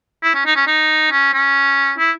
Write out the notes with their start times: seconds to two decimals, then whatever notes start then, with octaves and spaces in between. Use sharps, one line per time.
0.23 E4
0.35 C#4
0.46 D#4
0.56 C#4
0.67 D#4
1.11 C#4
1.33 C#4
1.98 E4